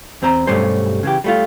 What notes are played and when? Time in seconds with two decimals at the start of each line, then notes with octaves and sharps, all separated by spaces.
0.22 E2 C4 C5 A#5
0.47 B1 G2 G3 A3 C#4 C5
1.03 C#3 E3 G4
1.24 G3 A3 F4